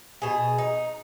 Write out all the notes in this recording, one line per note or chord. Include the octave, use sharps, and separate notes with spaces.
B2 G#4
D#4